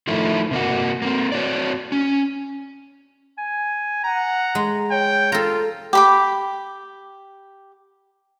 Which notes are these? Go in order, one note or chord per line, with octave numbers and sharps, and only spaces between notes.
D#3 F3 A3 E4
C3 A#3 F#4
A#3 C4
C4 F#4 C#5 D5
C#4
G#5
F#5 A#5
G#3
C#5 G5
F4 A4 A#5
G4 B5 D6